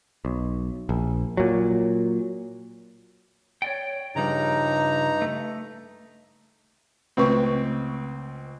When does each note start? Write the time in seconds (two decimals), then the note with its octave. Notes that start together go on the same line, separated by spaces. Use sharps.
0.25 B1
0.89 A#1
1.37 A#2 F#3
3.62 C#5 D5 G5
4.16 G2 C#3 F3 G3 D#4 A#5
5.22 A3
7.17 C#2 A3 C4 B4 C#6